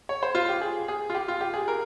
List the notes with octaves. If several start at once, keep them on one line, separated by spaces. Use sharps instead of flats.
C#5
C5
F4
G4
G#4
G#4
F4
G4
F4
G4
G#4
A#4